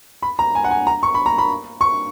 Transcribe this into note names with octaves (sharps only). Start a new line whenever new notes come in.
B5
A#5
G#5
F#5
G#5
A#5
C#6
B5
A#5
B5
C#6